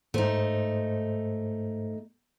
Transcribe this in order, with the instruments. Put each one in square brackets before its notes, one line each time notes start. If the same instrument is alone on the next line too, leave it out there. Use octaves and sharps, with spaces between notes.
[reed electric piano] G#2 C5 [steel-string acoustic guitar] A3 D#4